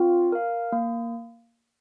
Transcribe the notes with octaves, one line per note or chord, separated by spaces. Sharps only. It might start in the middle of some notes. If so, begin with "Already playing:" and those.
Already playing: C4 F4
A#4 F5
A#3